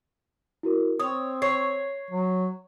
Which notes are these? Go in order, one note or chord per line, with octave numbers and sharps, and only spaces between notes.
E4 F#4 A#4
C4 C#5 D#6
C#5 C7
F#3